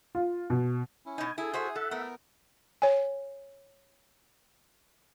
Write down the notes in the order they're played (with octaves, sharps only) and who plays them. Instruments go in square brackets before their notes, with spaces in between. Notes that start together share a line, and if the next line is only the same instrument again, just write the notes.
[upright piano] F4
B2
[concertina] C#4 E4
[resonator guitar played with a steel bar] B2 D#4 [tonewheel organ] G#5
[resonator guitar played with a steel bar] E4 [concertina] G#4 G#5 [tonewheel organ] A4
[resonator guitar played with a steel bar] F#4 C5 E5
[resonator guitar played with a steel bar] A4 [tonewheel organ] E5 F#5
[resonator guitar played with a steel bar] A3 [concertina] B3 A#4
[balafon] C#5 G#5